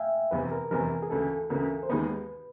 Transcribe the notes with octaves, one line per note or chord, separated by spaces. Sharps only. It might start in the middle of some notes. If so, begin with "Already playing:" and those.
Already playing: E5 F5 G5 G#5
F1 E2 C3 E3 B4
A#4
F1 E2 C3 E3 A#4
G#4
D2 C#3 E3 A4
D2 C#3 E3 A#4
C5
D#2 D#3 G#3 B3 D#4 B4